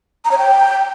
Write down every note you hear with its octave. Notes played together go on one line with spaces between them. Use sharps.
A#5
C#5
G5